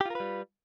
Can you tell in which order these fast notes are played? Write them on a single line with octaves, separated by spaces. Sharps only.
G4 F4 A#4 B4 G3